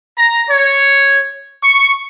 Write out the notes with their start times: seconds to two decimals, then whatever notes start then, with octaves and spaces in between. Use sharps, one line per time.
0.18 A#5
0.51 C#5
1.64 C#6